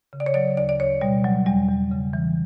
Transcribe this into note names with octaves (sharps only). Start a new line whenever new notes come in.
C#3
D5
C#5
F#3 D5
D2 D5
D5
D2 C#5
B2 G3
F#3
E2 G3
E2
C#3
E3